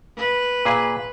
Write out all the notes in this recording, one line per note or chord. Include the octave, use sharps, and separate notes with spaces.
B4
A#2 G#4